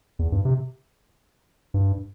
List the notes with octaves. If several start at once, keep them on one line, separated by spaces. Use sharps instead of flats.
E2
G2
C3
G2